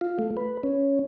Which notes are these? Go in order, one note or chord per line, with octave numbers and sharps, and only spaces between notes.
F4
A3
B4
C#4